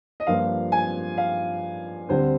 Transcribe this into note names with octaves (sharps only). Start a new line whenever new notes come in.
D#5
G2 F3 A#3 F4 F5
G#5
F5
D2 D3 G3 C4 C5